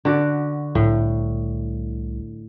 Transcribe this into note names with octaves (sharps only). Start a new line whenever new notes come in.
D3 F#4 D5
C2 A2